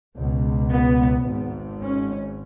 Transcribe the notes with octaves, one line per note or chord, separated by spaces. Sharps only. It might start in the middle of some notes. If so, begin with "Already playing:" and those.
C#2 B2
B3
G#1 G#2
C#4